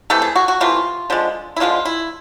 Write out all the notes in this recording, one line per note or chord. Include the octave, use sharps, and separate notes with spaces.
C3 E3 A3 A4
G#4
F#4
F#4
C3 E3 A3 F4
D3 F3 G#3
E4
D3 F3 G#3 F4
E4